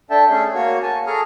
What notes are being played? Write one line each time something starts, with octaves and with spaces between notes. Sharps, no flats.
D4 A4 E5 G5 A5
A3 C#4 G#4
A#3 F#4 C#5
G#5 A5
G#4 A4 A#5 C#6 D#6 F6